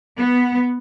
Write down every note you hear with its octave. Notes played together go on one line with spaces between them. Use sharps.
B3